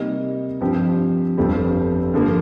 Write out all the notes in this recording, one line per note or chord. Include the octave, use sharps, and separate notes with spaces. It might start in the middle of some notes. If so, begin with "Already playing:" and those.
Already playing: C3 G3 A#3 D#4
G2 F3 C4 G4
G1 F2 D3 G3 C4
G2 D3 F3 A#3